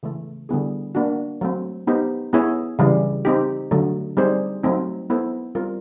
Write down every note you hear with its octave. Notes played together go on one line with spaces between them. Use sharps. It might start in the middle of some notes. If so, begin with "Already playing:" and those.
C#3 E3 A3
D3 G3 B3 E4 G#4
A#3 D4 F#4
F#3 A3 C4
B3 D#4 G4 C5
B3 E4 G#4 C#5
C#3 E3 G3
C4 D#4 G4
D3 F#3 A3
G3 C4 D#4 G#4 C5
F#3 A3 C4 D#4
B3 E4 A4 C5
G3 C4 F4 A#4